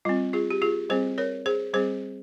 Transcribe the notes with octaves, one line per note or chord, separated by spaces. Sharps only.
G3 C4 F4
F4 G#4
G4
F4 G#4
G3 C4 G#4 C5
A#4 C#5
G#4 C5
G3 C4 G#4 C5